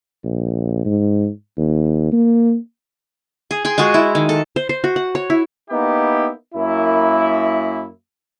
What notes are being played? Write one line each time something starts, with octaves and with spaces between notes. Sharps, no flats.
A#1
G#2
D#2
A#3
G#4
G#4 G5 C6
G#3 F4 F#4 G#4
E4
D#3
A4
C5
C5
F#4
F#5
C#5
E4
A#3 B3 D#4 E4 G4
F#2 A#3 E4